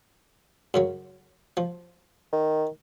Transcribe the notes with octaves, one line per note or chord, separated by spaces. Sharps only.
F#2 C#3 F#3
F3
D#3